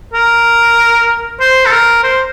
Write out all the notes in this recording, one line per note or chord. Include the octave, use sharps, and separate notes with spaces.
A#4
C5
A4
A#4
C5